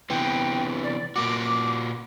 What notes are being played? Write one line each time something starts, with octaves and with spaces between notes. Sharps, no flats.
C3 E3 B3 G5
D5
A#2 A#3 F#4 D6